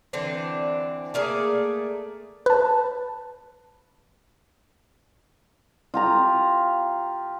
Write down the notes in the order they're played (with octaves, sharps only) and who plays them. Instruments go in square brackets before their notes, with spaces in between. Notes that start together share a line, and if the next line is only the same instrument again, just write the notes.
[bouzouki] D3 E3 C4 D4
A3 A#3 G#4 D5
[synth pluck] B4 A5
[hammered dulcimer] F4 G4 A#5